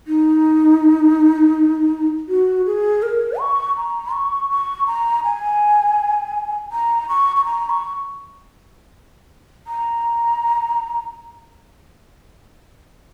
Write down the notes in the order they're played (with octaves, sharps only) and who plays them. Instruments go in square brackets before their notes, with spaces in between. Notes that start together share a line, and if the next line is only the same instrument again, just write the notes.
[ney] D#4
F#4
G#4
A#4
C#6
A#5
C#6
C#6
A#5
G#5
A#5
C#6
C#6
A#5
C#6
A#5